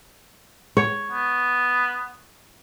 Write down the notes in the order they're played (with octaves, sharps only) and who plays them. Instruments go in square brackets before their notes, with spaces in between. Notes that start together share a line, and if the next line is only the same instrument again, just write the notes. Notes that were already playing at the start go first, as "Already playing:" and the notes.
[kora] C#5
[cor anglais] B3